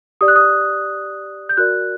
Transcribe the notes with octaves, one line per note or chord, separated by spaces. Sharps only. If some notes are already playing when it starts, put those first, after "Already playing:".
G4 D5 D#6
F#6
D#6
G6
F#4 A#4 D5 F#6